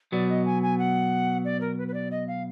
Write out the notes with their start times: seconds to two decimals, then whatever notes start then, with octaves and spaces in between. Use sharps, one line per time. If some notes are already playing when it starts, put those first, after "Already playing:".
0.12 B2 F#3 B3 D5
0.30 D#5
0.46 G#5
0.63 G#5
0.79 F#5
1.45 D5
1.61 A#4
1.78 B4
1.88 B4
1.94 D5
2.11 D#5
2.28 F5